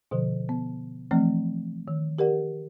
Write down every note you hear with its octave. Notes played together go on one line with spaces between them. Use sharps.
B2 D3 F3
B3
E3 F3 A3 C4
D#3
G4 A#4 D5 F#5